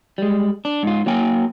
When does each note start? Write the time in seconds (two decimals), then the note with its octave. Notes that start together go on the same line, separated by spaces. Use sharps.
0.18 G3 G#3
0.65 D4
0.83 G#2 F4
1.06 F#3 A#3 G5 G#5